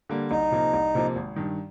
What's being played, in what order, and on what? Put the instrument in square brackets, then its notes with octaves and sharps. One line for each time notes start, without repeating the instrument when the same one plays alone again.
[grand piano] D3 G3 A#3
[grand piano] C2 [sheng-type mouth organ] D#4
[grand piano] C3 F3 A#3
C2
C3 F3 A#3
G#1
G2 D#3